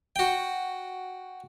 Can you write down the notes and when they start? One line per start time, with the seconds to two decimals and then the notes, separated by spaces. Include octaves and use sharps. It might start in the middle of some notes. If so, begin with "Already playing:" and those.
0.16 F#4 G5